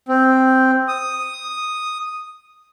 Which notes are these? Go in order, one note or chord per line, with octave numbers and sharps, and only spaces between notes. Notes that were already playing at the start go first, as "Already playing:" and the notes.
C4
D#6